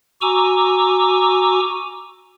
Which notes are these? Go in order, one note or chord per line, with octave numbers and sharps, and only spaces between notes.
F#4 G#5 A#5 C#6 D6 E6